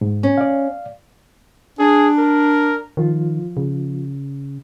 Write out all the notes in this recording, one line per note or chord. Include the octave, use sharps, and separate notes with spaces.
G#2
C#4
D5 F5
D4 G#4
A#4
D#3 F3 F4
C#3